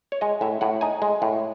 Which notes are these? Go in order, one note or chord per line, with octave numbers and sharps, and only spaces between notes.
C#5
G#3 D#5
A2 E5
A2 F#5
D#4 G#5
G#3
A2